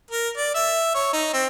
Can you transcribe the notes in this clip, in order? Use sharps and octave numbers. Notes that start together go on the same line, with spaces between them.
A#4
D5
E5
C#5
D#4
C4